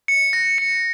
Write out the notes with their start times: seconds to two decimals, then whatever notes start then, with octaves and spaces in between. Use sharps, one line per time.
0.08 C#7
0.33 A#6
0.58 C#7